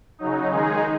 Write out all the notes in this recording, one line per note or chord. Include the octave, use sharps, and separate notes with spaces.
C#3 F#3 D#4
D#3 G#3 D#4 G#4